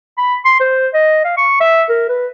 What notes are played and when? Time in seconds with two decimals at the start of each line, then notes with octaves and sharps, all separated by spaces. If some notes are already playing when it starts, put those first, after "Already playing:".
0.18 B5
0.45 C6
0.60 C5
0.93 D#5
1.24 F5
1.37 C#6
1.60 E5
1.89 A#4
2.09 B4